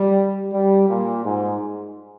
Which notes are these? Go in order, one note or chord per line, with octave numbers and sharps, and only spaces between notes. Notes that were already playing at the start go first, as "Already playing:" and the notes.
Already playing: G3
G3
A#2
G#2